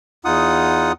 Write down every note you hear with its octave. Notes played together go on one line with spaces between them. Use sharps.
E2 D#4 F4 F#5 D#6